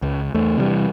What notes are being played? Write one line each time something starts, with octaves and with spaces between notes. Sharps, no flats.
C#2
E2 A3
C3 E3 F#3 G3